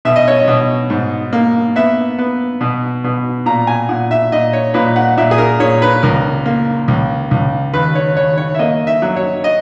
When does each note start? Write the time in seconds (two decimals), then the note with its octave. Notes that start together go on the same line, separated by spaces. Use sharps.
0.05 B2 E5
0.16 D#5
0.28 C#5
0.39 D#5
0.48 B2
0.90 G#2
1.33 A#3
1.76 B3 E5
2.19 B3
2.61 B2
3.04 B2
3.46 A#2 A#5
3.67 G#5
3.89 A#2 F#5
4.11 E5
4.32 A#2 D#5
4.53 C#5
4.74 A#2 B4
4.96 F#5
5.17 A#2 E5
5.31 G#4
5.38 A#4
5.60 A#2 C#5
5.82 B4
6.03 C#2 A#4
6.46 A#3
6.88 C#2
7.31 C#2
7.73 D#2 B4
7.95 C#5
8.16 D#2 C#5
8.37 C#5
8.55 E5
8.59 A#3 D#5
8.87 E5
9.02 F#3
9.17 C#5
9.44 D#5